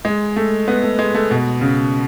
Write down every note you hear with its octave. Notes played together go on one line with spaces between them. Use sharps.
G#3
A3
B3
A3
G#3
A3
B2
C#3